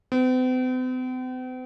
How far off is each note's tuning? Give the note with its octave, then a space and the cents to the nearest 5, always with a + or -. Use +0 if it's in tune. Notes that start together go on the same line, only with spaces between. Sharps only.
C4 -45